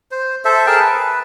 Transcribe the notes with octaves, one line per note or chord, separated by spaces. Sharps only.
C5
A4 C5 E5
G#4 A#4 G5 A5
B4